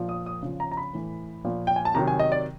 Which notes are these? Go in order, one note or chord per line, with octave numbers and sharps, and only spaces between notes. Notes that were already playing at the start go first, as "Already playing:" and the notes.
Already playing: A#2 F3
D#6
D#6
C#3 F3
A#5
A#5
B5
A2 E3
A#2 F3
G5
G#5
A5
C3 D#3 F#3 A#5
G#5
D#5
D5